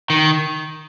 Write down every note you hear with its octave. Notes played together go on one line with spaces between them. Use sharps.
D#3